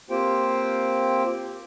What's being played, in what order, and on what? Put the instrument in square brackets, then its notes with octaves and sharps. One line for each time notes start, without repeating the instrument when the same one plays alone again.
[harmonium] A#3 C4 F4 G4 C5 G5